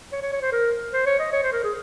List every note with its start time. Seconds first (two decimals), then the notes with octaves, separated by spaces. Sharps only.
0.12 C#5
0.22 C#5
0.33 C#5
0.42 C5
0.52 A#4
0.93 C5
1.06 C#5
1.19 D#5
1.32 C#5
1.43 C5
1.53 A#4
1.64 G#4